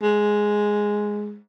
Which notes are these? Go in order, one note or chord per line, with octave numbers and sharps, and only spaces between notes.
G#3